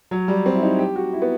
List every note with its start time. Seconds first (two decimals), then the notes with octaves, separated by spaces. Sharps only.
0.11 F#3
0.28 G3
0.46 C4
0.54 E4
0.63 D#4
0.79 G4
0.96 F#4
1.13 E4
1.22 B3